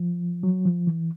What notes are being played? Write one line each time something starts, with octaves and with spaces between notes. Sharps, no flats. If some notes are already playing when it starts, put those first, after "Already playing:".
Already playing: F3
F#3
F3
E3